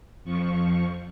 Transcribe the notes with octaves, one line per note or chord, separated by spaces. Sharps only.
F2 F3 C#6